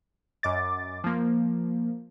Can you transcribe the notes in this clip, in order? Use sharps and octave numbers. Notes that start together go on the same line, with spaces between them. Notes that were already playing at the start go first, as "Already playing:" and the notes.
F#2 D#5 D6 A6
F3 A#3